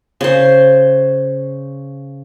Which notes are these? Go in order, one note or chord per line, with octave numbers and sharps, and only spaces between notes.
C#3 C5